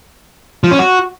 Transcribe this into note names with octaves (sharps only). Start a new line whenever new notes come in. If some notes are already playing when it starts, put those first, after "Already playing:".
F3
C#4
F#4